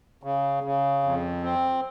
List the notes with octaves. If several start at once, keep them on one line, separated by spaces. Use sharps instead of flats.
C#3
C#3
F2
C4